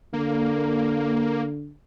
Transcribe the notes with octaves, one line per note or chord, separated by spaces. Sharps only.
D3 A#3